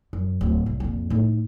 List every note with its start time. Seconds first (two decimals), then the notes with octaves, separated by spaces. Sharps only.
0.13 F#2
0.41 D1 A2
0.66 C2
0.80 F2 A#2
1.10 A2 D#4